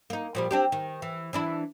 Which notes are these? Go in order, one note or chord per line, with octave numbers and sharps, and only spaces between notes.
A#3 D#4
A#2 F3 G3
C4 D4 G4
D#3
E3
E3 D4 E4